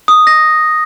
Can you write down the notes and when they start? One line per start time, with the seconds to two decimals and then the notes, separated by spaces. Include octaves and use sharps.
0.08 D#6
0.27 A#6